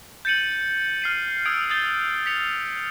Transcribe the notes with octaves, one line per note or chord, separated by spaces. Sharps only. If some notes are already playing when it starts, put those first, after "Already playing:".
G6 A6 C#7 D#7 F#7
F6 C7 D#7
D#6 E6 G#6 D7
D#6 G6 A6 G7
B6 C#7 F7